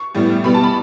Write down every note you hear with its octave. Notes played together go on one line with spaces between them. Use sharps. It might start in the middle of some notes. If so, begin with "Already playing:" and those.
Already playing: C#6
A2 G3 B3
B2 G3 B3 B5
A5
B5